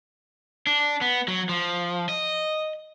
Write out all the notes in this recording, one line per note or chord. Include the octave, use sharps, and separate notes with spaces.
D4
B3
F#3
F3
D#5